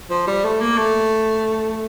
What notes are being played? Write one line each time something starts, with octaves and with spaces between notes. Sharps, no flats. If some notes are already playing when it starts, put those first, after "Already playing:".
F3
G3
A3
A#3
A3